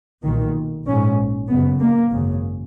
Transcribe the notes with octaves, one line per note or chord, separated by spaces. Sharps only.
B1 A#2 D#3
A#1 G#2 C#4
F#1 F#2 C#3 B3
A#3
G#1 F#2 C#3